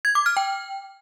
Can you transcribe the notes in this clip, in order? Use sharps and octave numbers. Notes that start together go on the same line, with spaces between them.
G#6
D6
F6
G5